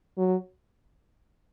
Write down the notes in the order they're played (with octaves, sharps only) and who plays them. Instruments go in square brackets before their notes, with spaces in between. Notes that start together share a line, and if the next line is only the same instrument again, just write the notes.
[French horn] F#3